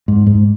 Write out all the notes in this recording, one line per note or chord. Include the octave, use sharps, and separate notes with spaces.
G#2
G#2